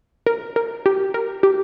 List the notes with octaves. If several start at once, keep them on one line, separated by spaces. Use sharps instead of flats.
A#4
A#4
G4
A#4
G4